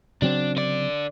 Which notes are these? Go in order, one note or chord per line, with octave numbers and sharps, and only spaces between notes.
C#3 F#3 C4 D4
D3 D5